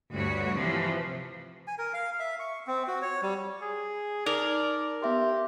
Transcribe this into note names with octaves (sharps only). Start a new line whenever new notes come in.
D2 G2 G3 F#4 C#5
C3 E3 F3
G#5
A#4
F5
E5
C#6
C4
F#4
C#5
G3
G#4
D#4 A#4 D5
B3 G4 E5 C6